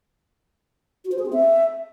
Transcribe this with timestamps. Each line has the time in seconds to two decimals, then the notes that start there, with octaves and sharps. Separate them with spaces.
1.05 F#4
1.12 C5
1.19 G#4
1.26 C4
1.33 E5